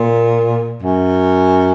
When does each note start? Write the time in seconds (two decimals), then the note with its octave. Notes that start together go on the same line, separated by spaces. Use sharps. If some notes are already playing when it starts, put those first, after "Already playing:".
Already playing: A#2
0.82 F#2